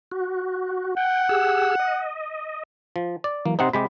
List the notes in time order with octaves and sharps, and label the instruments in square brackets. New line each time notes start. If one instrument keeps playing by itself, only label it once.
[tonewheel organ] F#4
[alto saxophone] F#5 [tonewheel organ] G5
[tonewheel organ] G4 G#4 E6
D#5
[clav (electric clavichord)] F3
D5
[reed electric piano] E3 F#3 [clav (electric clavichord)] A#3
[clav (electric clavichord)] C3 C4 D#4 [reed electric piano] C5 F#5 C6
[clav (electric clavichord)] C3 G#3 G4 [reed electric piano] B5